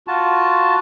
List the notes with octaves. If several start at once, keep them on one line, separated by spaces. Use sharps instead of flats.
F4 F#4 A5